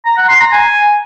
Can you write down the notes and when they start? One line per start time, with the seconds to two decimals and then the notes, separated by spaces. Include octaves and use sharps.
0.06 A#5
0.17 F#5
0.29 C6
0.40 A#5
0.52 G#5